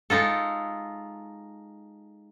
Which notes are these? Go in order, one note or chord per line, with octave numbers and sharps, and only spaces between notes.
G#3 D#4 F4 A4